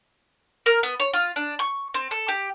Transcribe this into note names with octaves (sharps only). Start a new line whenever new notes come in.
A#4
B3
C#5
F4
D4
C#6
C4
A4
G4